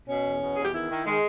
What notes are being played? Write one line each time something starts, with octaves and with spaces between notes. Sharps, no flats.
B2 C#4
E2
B2
E2 G#4
G4
D#3 E4
D#3
D#3 G#3